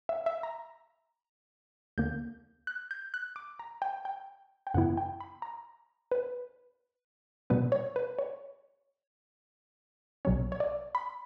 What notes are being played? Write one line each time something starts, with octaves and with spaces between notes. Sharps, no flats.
E5
E5
A#5
D2 D3 A#3 G6
F#6
G6
F#6
D6
A#5
G5
G5
G5
F#2 C#3 E3 B3 E4 F#5
G5
B5
A#5
B4
B2 G3 B3 B4
C#5
B4
C#5
B1 B2 F#3 C#4 C#5
C#5
D5
B5